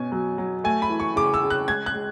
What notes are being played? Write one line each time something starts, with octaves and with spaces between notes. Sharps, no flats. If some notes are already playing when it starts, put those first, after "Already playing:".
Already playing: B2 C#4 G#5
F#3
F#3
A3 G#5
B5
E3
C#6
C#3 D6
E6
C#3
F#6
G#3 G#6
F#6
G#3